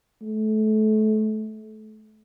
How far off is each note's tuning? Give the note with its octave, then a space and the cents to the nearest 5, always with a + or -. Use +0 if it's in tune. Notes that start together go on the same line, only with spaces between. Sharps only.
A3 -30